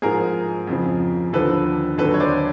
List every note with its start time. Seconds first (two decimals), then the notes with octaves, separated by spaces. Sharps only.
0.02 G#2 F3 G#4 A#4
0.67 F2 C#3 F3
1.33 D#2 D3 F3 A4 B4
1.98 D#2 D3 F#3 A4 B4
2.14 C#5
2.20 C5 D5